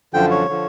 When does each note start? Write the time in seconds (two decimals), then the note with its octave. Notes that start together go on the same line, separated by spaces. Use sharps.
0.14 F#2 D3 F3 G5
0.31 C#5
0.49 D3 F3